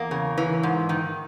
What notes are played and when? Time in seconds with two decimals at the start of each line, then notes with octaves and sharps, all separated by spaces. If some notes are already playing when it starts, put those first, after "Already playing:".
Already playing: E2 A#3
0.11 C#3
0.38 E3
0.63 G#2
0.89 D#3